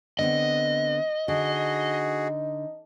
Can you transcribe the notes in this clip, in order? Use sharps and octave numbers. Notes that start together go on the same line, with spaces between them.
D3 B3 C4 D#5
D3 D#4 F#4 G#4